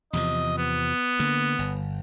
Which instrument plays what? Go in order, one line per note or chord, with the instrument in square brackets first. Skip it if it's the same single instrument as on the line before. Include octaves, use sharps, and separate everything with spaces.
[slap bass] E2 C3 F3 [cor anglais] D#5
[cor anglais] B3
[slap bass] D3 A#3
G1